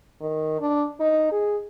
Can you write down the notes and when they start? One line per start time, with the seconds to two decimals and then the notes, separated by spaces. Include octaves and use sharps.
0.21 D#3
0.60 D4
1.00 D#4
1.32 G#4